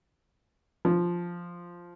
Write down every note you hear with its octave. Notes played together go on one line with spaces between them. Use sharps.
F3